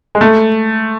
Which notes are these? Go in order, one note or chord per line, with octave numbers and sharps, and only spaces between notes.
G#3
A3